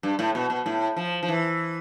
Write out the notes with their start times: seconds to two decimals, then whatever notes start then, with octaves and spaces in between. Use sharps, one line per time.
0.03 G2
0.19 A2
0.35 B2
0.50 B2
0.66 A2
0.97 F3
1.23 F3
1.28 E3